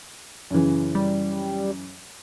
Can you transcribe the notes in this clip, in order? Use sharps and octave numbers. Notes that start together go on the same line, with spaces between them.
F#2 C#3 E3
G3